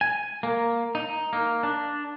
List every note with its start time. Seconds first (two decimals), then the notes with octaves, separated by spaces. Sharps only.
0.01 G#5
0.43 A#3
0.95 D#4
1.33 A#3
1.63 D4